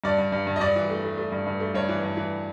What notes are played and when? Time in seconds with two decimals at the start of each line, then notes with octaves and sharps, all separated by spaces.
0.04 G2 D5
0.18 G2
0.32 G2
0.47 G2
0.56 D#5
0.60 G2 D5
0.76 E3
0.90 A3
1.04 A3
1.18 A3
1.32 G2
1.46 G2
1.60 A3
1.75 G2 C#5
1.89 E3
2.03 G2
2.17 E3